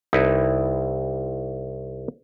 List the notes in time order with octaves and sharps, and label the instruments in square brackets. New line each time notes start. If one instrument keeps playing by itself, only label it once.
[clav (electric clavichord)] C2 D#4 E4 B4